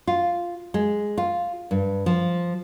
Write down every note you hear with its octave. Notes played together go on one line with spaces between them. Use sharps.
F4
G#3
F4
G2
F3